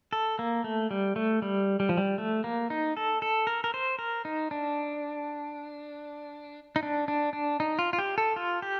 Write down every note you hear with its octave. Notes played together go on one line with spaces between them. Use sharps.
A4
A#3
A3
G3
A3
G3
G3
F3
G3
A3
A#3
D#4
A4
A4
A#4
A#4
C5
A#4
D#4
D4
D#4
D4
D4
D4
D#4
F4
F4
G4
A4
F4
G4